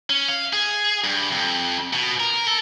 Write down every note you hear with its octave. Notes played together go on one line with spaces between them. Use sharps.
C#4
F5
G#4
G2
F2
B2
A#4
A4